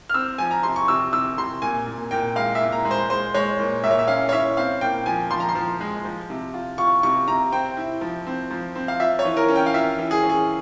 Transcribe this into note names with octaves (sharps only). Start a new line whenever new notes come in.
F6
C4 E6
F3 G#5
A#5
C3 C6
C#6
C3 E6
C3 E6
C3 C6
A#2 G#5
A#2
A#2 G5
G#3 F5
E5
A#2
A#5
G#3
C5
G#3 C5
G#3 C#5
A#2
A#2 E5
C#5
E5
C#4 F5
C#5
E4 E5
C4 F5
A#2 G5
F3 G#5
F3 C6
A#5
C6
F3
G#3
F3
C3
F4
F4 C#6
C3 C#6
C3 A#5
C4 G5
E4
F3
C4
F3
C4
F5
F4 E5
C#5
E3
A#4
C#4
G5
F5
F4 E5
E3
G#4
C#4
G#4